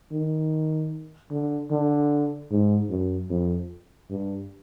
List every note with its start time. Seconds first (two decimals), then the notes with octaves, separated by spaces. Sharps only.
0.12 D#3
1.30 D3
1.71 D3
2.51 G#2
2.90 F#2
3.30 F2
4.10 G2